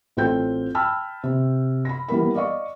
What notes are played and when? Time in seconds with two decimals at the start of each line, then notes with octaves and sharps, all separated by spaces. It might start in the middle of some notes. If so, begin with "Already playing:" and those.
0.17 A1 C4 F4 A4 G5 G6
0.75 G5 A5 B5 E6 F6
1.23 C3
1.85 B5 A#6
2.09 E3 G3 A#3 B3 A#4 B5
2.35 D5 D#5 F5 C#6